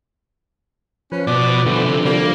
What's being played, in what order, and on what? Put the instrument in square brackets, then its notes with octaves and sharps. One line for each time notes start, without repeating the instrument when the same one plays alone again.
[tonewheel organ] F3 B4 [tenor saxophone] C#4
[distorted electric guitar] B2 [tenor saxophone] D5
[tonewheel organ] D3 F3 [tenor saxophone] E3 [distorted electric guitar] G3 B3
[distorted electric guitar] C3
[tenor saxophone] G3 [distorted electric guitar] A#3